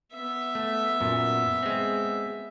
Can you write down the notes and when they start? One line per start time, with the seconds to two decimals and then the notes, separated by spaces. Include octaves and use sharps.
0.12 B3 E5
0.55 A3
1.01 F#2 A#2
1.63 G#3 C4